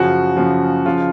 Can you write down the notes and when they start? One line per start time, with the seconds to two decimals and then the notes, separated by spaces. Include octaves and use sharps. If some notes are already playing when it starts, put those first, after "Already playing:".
Already playing: F#2 C#3 F3 F#4
0.37 F#2 C#3 F3
0.85 C#3 F3 F4